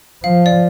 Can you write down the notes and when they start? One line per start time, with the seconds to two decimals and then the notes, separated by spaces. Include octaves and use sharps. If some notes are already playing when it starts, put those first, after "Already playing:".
0.24 F3 F5
0.46 D5